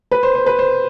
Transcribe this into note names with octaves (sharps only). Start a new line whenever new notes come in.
B4
C5
C5
B4
C5